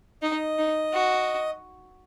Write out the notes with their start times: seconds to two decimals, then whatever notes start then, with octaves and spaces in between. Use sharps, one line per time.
0.22 D#4 D#5
0.58 D#4
0.94 F#4